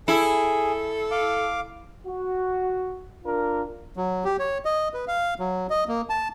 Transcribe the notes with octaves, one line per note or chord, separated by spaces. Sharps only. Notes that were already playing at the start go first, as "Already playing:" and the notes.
E4 G#4 A4
F5 D6
F#4
D4 F4 A#4
F#3
G4
C#5
D#5
B4
F5
F#3
D#5
A#3
A5